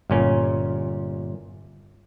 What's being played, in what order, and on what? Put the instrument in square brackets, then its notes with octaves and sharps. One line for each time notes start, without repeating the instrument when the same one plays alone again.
[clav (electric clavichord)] G1 A#2 C#4